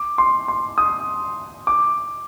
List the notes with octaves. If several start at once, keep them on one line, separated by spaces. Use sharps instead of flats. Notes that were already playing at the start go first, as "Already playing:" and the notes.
Already playing: D6
C6
C6
D#6
D6